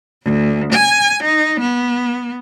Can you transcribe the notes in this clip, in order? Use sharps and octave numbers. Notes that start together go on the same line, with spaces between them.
D2
G#5
D#4
B3